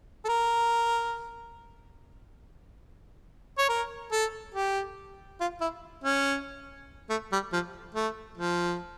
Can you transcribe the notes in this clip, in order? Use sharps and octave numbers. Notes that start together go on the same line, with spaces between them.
A4
A#4
C#5
A#4
A4
G4
F4
E4
C#4
A3
G3
F3
A3
F3